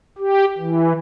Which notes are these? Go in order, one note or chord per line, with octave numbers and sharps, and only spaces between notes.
G4
E3